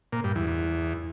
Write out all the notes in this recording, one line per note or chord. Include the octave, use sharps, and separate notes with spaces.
A#2
G2
E2
E2